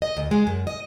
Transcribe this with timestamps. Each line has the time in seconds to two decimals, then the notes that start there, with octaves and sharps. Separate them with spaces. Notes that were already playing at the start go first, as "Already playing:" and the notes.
0.02 D#5
0.17 D2
0.31 G#3
0.47 F#2
0.67 D#5